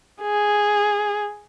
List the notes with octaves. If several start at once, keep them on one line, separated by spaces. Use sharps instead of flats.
G#4